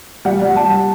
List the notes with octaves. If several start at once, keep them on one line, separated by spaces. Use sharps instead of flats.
G3 F#5
G3
G3 A5